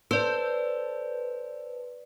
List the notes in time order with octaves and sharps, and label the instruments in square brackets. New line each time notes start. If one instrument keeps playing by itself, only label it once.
[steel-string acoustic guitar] A4 C5 [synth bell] B4 D5